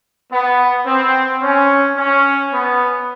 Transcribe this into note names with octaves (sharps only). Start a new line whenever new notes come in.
B3
C4
C#4
C#4
B3